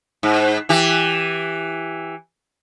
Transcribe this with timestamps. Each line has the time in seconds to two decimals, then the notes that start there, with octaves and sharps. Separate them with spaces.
0.23 G#2
0.69 E3 G4